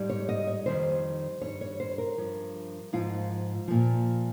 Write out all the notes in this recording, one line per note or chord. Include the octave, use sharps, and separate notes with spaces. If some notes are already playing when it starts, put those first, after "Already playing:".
Already playing: G#2 G3
C#5
D#5
C#5
F2 D#3 G3 C5
G2 G3 C#5
C#5
C5
A#4
G2 F3
G#2 F3 F4
A#2 F3